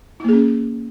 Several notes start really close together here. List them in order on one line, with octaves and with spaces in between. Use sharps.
E4 A#3 G#4 C#4